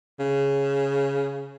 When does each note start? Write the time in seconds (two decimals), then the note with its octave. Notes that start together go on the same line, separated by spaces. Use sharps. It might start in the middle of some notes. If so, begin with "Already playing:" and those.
0.20 C#3